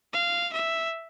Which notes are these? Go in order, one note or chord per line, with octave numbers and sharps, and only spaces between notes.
F5
E5